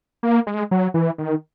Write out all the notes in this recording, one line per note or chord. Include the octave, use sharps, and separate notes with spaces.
A#3
G#3
F#3
E3
D#3